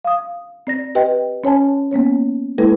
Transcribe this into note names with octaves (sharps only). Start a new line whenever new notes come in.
F5 D#6
C4 D5 A#6
G4 B4 D#5 G5
C#4 C#5 G#5 A5
A#3 B3 C#4 C#5
G#3 A#3 E4 A4 B4